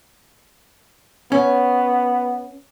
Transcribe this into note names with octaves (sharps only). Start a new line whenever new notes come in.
B3 C#4